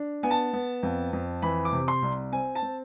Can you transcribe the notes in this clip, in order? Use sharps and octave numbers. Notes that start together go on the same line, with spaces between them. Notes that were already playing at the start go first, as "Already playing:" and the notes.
Already playing: D4
B3 G#5
A5
B3
F2
F2
E3 B5
D6
C3
C6
C2
C4 G#5
A5
C4